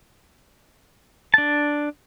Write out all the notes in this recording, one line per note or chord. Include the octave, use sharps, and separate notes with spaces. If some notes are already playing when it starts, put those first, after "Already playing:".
D4 A5